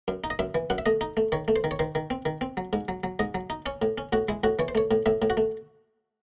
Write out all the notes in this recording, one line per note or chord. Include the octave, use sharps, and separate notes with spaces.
F#2
D#4
D#5
F#2 E5
E3
F#2 F#5
E5
A3 D#5
D#4
A3
D#3 C#5
A3
C5
D#3
C#5
D#3 C5
D#3
C4
D#3
C4
F#3
G#2
F#3
F#3
G#2 D#5
F#3
D#4
C#4 C#5
A2
C#4
A2 F#4
G#3 E4
A2 F#4
E3 C#5
C5
A3 C#5
A2
A2 E5
A2
F#4
A3